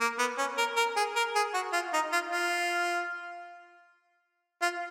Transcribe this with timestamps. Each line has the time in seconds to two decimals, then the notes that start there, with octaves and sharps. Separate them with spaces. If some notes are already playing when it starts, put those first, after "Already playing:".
0.01 A#3
0.19 B3
0.38 C#4
0.58 A#4
0.76 A#4
0.97 G#4
1.16 A#4
1.35 G#4
1.54 F#4
1.73 F4
1.93 D#4
2.12 F4
2.31 F4
4.62 F4